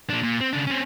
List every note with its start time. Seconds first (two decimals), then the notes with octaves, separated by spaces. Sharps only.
0.10 A#2 D4
0.23 A#2
0.41 C4
0.53 C#3 D4
0.67 C4 C#4